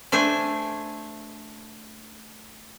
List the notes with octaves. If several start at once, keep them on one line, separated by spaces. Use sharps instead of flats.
A3 D4 C5 G#5